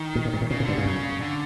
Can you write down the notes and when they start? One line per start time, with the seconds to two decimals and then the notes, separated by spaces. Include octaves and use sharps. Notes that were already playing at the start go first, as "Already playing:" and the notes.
Already playing: D#3
0.15 A#2
0.25 A2
0.34 G2
0.41 A2
0.50 A#2 C#3
0.60 A2
0.64 G2 D3
0.78 G2 C#3
0.86 F#2
1.21 D3